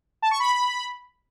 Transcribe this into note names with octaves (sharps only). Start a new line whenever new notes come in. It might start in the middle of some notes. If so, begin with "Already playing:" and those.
A5
C#6
B5